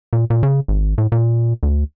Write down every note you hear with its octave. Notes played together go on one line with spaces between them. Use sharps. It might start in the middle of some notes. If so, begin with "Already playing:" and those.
A#2
A#2
C#3
G#1
A2
A#2
D2